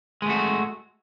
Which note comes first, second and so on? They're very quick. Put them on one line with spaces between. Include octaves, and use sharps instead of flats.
G#3 A3 F#4